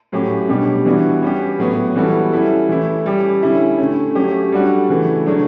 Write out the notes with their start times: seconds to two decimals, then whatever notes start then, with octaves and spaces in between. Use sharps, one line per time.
0.12 A2 F#3 C#4 G4
0.48 B2 G3 D4 G4
0.85 E3 G3 B3 D4 F#4
1.22 G3 C#4 G4
1.59 A2 F#3 B3
1.96 E3 G3 B3 F#4 A4
2.32 G3 C#4 E4 A4
2.69 E3 A3 E4
3.06 G3 C#4 G4
3.42 D3 G3 C#4 E4
3.79 D3 A3 C#4
4.15 F#3 A3 C#4 G4
4.52 G3 D4 F#4 A4
4.88 C#3 E3 A3
5.26 C#3 F#3 A3 D4